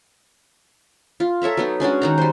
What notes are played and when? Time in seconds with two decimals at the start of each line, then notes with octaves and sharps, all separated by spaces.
1.20 F4
1.42 A4 C#5 E5 A#5
1.57 F#3 B3 D#4
1.80 G#3 C#4 D4 F#4
2.02 D#3 D#4 A#5
2.18 G3 C5